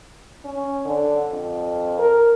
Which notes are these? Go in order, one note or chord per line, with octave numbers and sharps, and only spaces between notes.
C#4
D3
F2
A#4